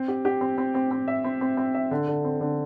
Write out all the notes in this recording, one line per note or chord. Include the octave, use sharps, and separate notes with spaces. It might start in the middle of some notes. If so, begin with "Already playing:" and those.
Already playing: C4
G4
G4
C4
C4
C4
C4
E5
C4
C4
C4
E5
D3
D3
C4
D3